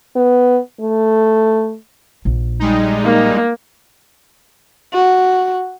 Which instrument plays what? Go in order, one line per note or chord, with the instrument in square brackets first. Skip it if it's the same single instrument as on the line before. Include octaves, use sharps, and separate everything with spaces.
[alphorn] B3
A3
[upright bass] A#1
[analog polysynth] G3 G#3 D#4
[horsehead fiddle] A#3
[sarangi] F#4